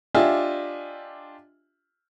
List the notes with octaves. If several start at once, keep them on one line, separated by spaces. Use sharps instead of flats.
D4 F4 G4 D#5 E5 G#5